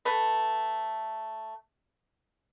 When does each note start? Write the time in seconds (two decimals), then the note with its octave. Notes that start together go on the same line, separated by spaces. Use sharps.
0.05 A3 B4